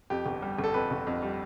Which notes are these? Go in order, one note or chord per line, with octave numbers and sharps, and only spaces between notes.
F2 G4
G1
G3
G1
A4
F2 B4
G1
F2
G3